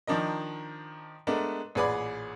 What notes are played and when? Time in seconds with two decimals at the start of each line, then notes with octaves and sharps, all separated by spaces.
0.07 D#3 F3 D4 A#4 D#5
1.27 G#3 A3 B3 D4 A#4
1.75 A1 A#2 G#4 B4 D5 B5